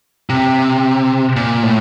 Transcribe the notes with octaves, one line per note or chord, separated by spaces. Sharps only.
C3
A#2
A2